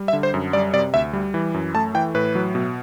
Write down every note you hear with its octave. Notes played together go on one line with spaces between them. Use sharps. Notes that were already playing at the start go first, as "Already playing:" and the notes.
Already playing: G3
E5
D3
C5
F#2
G3 D5
C3 D5
D2 E5
G3
E3
F#2
A3 A5
E3 G5
A2 B4
F#3
B2